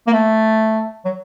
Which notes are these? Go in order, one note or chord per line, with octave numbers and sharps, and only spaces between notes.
A#3
A3
F#3